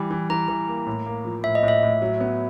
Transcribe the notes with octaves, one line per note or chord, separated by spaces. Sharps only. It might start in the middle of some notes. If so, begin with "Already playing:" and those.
Already playing: E3 G3
E3
E3 A#5
E3
A#3
A2
A#3
F3
A2 E5
D#5
A2
E5
A2
F#3
B3